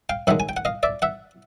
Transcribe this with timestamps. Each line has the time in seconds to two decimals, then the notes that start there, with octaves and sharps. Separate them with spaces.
0.09 F5 G5
0.27 F#2 D#3 G#3 E5 F#5
0.40 G#5
0.49 G5
0.57 F#5
0.65 D#5 F5
0.83 D5 E5
1.02 E5 F#5